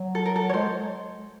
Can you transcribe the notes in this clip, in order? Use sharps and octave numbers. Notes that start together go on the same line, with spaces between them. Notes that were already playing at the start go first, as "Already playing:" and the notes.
Already playing: F#3
A4
A#4
A4
C#5
G#3 C5